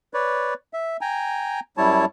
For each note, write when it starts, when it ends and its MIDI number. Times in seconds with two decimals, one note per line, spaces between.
0.14 0.54 71
0.14 0.54 73
0.14 0.54 74
0.73 0.97 76
1.01 1.60 79
1.01 1.60 80
1.01 1.60 82
1.77 2.05 42
1.77 2.05 55
1.77 2.05 64
1.77 2.05 73
1.77 2.05 81